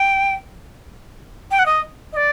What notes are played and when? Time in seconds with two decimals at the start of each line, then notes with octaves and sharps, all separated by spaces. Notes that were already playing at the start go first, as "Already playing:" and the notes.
Already playing: G5
1.51 G5
1.59 F#5
1.66 D#5
2.13 D#5
2.17 D5